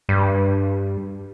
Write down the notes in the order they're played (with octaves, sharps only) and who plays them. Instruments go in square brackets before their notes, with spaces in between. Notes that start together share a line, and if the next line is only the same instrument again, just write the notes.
[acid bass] G2